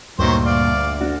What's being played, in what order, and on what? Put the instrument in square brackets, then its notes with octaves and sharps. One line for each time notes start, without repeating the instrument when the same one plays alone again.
[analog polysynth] D2 [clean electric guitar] G2 A#2 [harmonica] D#3 F#3 C5
[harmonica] D5 F5
[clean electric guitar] D4 F#4